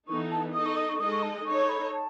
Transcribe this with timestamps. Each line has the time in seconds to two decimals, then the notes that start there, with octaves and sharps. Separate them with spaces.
0.08 E3 B3 D#4 A4 C#6
0.32 A5
0.54 D#4 A4 D#5 D#6
0.66 C#6
0.77 D#6
0.89 C#6
1.00 G#3 D#4 A4 D#5 D#6
1.12 C#6
1.23 A5
1.46 D#4 A4 C#5 C#6
1.69 B5
1.92 A5